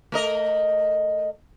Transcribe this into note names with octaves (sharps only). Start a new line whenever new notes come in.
A3 A#4 D#5